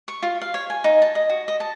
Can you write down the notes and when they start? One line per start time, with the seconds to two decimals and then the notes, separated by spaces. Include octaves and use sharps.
0.08 C#6
0.23 F4
0.42 F5
0.54 C#5
0.70 G#5
0.84 D#4
1.02 A5
1.15 D#5
1.30 F#4
1.48 D#5
1.60 A5